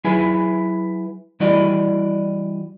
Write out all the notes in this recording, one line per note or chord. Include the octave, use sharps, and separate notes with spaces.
F#3 E4 G#4 B4 E5 G#5
E3 G3 E4 F#4 D5 D#5